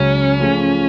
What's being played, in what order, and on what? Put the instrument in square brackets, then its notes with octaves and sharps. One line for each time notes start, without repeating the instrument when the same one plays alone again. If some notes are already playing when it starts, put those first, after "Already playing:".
Already playing: [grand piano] C#2 C#3 F#3 [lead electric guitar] C#4
[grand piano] F3 A3 F4 G#4